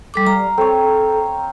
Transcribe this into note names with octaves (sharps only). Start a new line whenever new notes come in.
G3 A4 D6
G3 F5 A#5
C4 A4 C#5